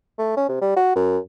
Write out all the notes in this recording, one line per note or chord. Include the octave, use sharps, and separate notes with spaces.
A3
C#4
C3
G3
F#4
F#2